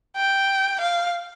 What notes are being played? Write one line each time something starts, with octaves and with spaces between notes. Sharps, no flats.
G5
F5